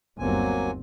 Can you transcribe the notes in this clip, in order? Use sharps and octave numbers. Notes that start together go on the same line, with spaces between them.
G1 D#2 F#3 A#3 C4 G#5